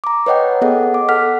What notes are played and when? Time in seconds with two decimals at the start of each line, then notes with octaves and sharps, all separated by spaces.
0.04 A#5 D6
0.26 B4 C#5 D#5 F#5 G5
0.61 B3 G#4 A4 D#5 F#5
0.94 D6
1.09 A4 F#5 F6 B6